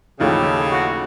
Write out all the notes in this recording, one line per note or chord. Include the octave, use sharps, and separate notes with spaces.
A1 D#2 C#3 F3 D#4 E4 G4 A4
F#4